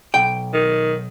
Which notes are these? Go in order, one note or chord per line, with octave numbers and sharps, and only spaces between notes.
B1 G5
D#3